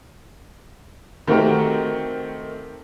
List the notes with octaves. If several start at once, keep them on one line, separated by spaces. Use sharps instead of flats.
D#3 A3 C4 F#4 G4 A#4